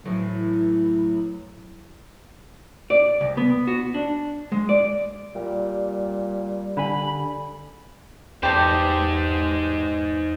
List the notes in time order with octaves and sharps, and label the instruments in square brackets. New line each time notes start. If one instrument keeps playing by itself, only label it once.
[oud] A2 E3 [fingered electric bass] F#3
[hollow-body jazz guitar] D5
C2
B3
F#4
D4
G#3
D5
[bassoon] A#2 [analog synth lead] G3
[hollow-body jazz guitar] D3 G#5 [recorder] B5
[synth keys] E2 [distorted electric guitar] D#4 C5 [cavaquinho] G4 A4